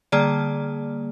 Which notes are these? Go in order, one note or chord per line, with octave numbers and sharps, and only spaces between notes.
D3 G3 A#3 G#4 D5